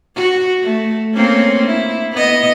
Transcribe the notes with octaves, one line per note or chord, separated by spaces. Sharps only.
F#4
A3
A#3 C4 C#4
E4
B3 D#5